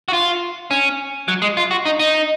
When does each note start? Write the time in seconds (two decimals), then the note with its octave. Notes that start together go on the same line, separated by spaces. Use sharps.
0.08 F#4
0.13 F4
0.71 C#4
1.28 F#3
1.42 G#3
1.57 F4
1.71 F#4
1.85 D#4
1.99 D#4